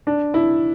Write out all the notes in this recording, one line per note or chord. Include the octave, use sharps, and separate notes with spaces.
D4
E4